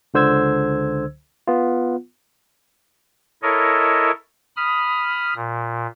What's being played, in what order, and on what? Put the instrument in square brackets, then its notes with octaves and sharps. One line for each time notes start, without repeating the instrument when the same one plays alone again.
[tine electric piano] C#2 D3 C5 E6 G#6
B3 F4
[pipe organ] E4 A4 A#4 C#5 D#5
B5 D#6 F6
A#2